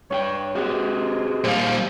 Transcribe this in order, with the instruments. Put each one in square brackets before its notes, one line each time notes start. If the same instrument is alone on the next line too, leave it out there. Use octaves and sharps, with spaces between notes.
[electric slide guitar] G2 F#4 G5 [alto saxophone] C#5
[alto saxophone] G#3 [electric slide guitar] C4 F#4 G4
[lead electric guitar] A#2 G3 [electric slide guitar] C5 F5